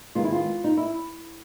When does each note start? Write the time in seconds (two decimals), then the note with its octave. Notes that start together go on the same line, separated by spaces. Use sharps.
0.15 D#3 G#3 B3 F4
0.24 E4
0.32 F4
0.64 D#4
0.77 E4